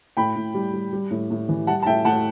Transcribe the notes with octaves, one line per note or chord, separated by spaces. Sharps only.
A2 G5 B5
A2
G3
G3
G3
A2
A2
E3
G3 F#5 A5
A5
A2 E5 G5
A2 F#5 A5